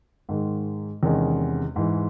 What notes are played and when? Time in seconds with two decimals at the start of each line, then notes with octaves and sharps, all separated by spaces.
0.29 G#2 D#3 G#3
1.03 E2 C3 D#3 G#3 C#4
1.76 G#2 E3 G#3